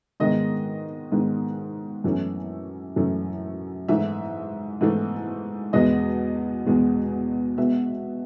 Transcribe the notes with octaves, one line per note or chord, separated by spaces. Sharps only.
G#2 D#3 G#3 B3 D#5
G#2 D#3 G#3 B3
F#2 E3 A3 C#4
F#2 E3 A3 C#4
G#2 E3 A3 E5
G#2 E3 A3
E2 B2 G#3 B3 D#5
E2 B2 G#3 B3
B2 G#3 B3 E5